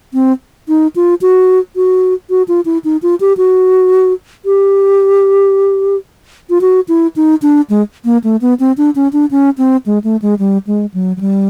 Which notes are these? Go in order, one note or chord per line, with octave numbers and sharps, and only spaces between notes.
C4
D#4
F4
F#4
F#4
F#4
F4
E4
D#4
F4
G4
F#4
G4
F4
F#4
E4
D#4
D4
G#3
A#3
A3
B3
C4
D4
C#4
D4
C#4
C4
G#3
A3
G#3
G3
G#3
F#3
F#3
G3